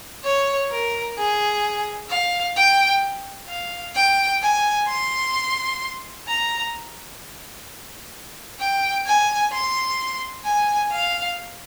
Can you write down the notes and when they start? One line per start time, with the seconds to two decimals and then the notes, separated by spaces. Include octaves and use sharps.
0.24 C#5
0.70 A#4
1.17 G#4
2.10 F5
2.56 G5
3.49 F5
3.95 G5
4.42 G#5
4.88 C6
6.27 A#5
8.60 G5
9.06 G#5
9.52 C6
10.45 G#5
10.92 F5